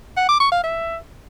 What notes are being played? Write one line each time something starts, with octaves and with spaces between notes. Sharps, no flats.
F#5
D6
C#6
F5
E5